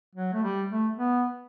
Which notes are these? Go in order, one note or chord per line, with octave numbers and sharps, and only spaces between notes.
F#3
A3
G3
A3
B3